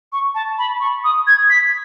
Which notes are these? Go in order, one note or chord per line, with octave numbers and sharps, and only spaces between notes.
C#6
A5
B5
C#6
D#6
G#6
B6